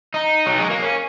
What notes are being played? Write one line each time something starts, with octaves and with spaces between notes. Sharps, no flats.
D#4
F#3
G#3
A#3
C#4